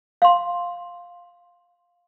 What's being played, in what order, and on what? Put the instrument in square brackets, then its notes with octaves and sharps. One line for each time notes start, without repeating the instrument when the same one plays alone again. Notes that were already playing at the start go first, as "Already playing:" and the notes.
[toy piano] F5 C6